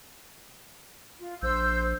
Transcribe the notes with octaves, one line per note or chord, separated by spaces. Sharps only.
F4
A#1 C5 E6 G6